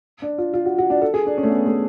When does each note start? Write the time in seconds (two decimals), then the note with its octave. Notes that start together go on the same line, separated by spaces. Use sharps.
0.22 D4
0.38 F4
0.54 F4
0.66 F#4
0.78 F#4
0.90 D4
1.01 A4
1.14 G#4
1.26 D4
1.37 C#4
1.43 A3
1.50 B3
1.66 A3